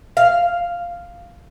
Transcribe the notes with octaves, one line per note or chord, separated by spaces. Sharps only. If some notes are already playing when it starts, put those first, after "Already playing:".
F5